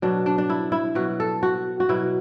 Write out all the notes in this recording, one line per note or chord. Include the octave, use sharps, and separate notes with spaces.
B2 F#3 D4
D4
D4
E4
E4
B2 F#3 F#4
A4
F#4
F#4
B2 F#3 E4